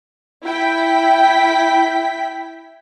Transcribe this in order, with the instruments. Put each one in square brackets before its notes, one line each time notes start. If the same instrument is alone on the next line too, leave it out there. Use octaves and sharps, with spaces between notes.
[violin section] E4 G5 B6